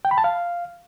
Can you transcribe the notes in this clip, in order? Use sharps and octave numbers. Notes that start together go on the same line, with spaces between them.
G5
B5
A5
F5